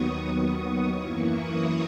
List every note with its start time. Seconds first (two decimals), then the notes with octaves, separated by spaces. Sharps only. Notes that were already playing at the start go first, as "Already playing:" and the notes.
Already playing: D#2 D#3 F#3 B3 C#6 D#6
0.56 D#6
0.96 F#2 E3 A#3 E4 C#6
1.37 D#6